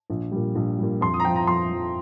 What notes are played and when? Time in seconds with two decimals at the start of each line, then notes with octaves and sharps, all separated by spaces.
0.10 A#1
0.32 A#2 G3
0.55 A#1
0.79 A#2 G3
1.01 F2 C6
1.14 D#6
1.20 A#5
1.25 F3 G5
1.36 A#5
1.47 F2 C6
1.71 F3